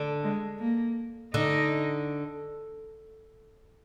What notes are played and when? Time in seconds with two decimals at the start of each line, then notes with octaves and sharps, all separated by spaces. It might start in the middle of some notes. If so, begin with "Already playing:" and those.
Already playing: D3
0.23 G#3
0.59 A#3
1.34 D3 D#4